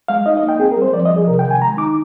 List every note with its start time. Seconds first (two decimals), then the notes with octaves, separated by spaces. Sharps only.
0.08 G#3 F5
0.26 D#4 D#5
0.37 D#5
0.43 A#3
0.49 G5
0.59 C4 G#4
0.71 A#4
0.77 G3 C5
0.93 F3 D5
1.05 D#5
1.10 F3
1.16 G#4
1.27 C3 A#4
1.39 G5
1.44 D#3
1.51 G#5
1.61 G#3 A#5
1.78 D#4 D6